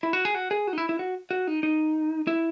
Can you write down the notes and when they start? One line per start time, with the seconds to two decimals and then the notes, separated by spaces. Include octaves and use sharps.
0.03 E4
0.13 F#4
0.25 G#4
0.35 F#4
0.51 G#4
0.67 F#4
0.73 D#4
0.78 E4
0.89 E4
0.99 F#4
1.31 F#4
1.47 D#4
1.63 D#4
2.27 E4